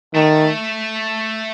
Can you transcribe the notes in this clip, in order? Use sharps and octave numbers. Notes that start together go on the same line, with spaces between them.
D#3 A3